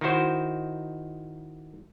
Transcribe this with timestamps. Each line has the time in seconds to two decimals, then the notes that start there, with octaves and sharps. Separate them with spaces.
0.01 D#3 D#4 E4 F#4 C5